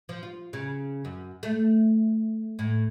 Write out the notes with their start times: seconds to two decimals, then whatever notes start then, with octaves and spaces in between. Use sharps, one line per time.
0.09 F3
0.23 F4
0.53 C#3
1.05 F#2
1.43 A3
2.59 A2